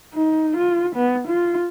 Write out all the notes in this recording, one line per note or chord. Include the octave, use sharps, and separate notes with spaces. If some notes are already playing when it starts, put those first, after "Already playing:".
D#4
F4
B3
F4